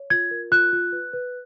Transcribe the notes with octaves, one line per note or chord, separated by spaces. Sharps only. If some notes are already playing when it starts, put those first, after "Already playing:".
Already playing: C#5
F4 G#6
A#4
F4 F#6
F4
B4
B4